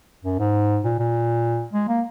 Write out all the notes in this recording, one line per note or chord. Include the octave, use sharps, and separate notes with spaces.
F#2
G#2
A#2
A#2
G#3
A#3